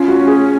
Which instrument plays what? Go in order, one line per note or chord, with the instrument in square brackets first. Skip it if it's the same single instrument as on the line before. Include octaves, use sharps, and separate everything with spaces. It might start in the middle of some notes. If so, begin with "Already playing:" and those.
Already playing: [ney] C#4 [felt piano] F4
[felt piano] F#4
G#4